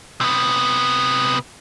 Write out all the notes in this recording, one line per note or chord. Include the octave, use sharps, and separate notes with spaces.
C3 B3